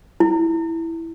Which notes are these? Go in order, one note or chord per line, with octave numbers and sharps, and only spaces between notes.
E4